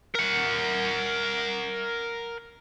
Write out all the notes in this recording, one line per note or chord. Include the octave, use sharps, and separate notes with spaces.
A#4 F#5